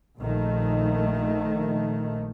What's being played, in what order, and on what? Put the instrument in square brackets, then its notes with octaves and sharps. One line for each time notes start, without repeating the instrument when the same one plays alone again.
[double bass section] A#1 D#3 A3